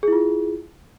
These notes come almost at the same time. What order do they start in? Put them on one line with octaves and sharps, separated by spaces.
G#4 E4 F4